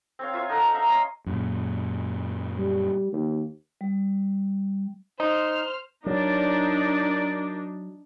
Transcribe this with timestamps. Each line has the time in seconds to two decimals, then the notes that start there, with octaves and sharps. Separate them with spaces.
0.19 C4 C#5 F5
0.34 F4 C#5 E5
0.49 D#4 A4 A#4 F#5
0.73 E5 F5 A#5
0.87 C#4 C#5 D#5 C6
1.26 F#2 A#2
2.58 G3
3.13 D#2
3.81 G3
5.20 D#4 C5 F6
6.06 F#3 D4 D#4 A#4 D5